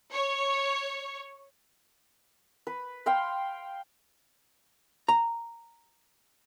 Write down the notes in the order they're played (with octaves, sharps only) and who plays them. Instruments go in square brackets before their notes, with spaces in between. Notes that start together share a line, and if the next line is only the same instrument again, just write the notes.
[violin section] C#5
[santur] B4
F5 G5 C6
[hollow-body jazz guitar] A#5